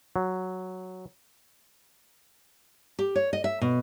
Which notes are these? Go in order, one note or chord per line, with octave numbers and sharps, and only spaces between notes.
F#3
G4
C#5
D#5
E5
B2